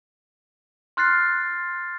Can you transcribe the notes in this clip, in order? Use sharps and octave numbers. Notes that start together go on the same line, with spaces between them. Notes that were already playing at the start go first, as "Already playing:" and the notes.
C6 F6 F#6 A6 C7